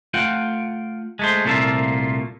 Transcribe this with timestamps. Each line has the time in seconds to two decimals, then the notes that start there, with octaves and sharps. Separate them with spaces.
0.14 A3 F4 F#5 G5
1.19 G#3 A3 C5
1.45 C2 A#2 A3 A#3 F4 E5